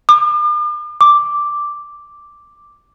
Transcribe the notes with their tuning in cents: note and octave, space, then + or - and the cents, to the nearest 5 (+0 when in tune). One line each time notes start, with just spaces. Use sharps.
D6 +45
D6 +0